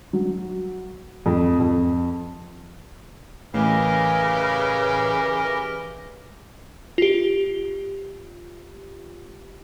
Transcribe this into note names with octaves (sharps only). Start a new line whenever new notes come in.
F#3
F2
F2
A1 C#3 E3 G4 A#4 D#5
F4 G4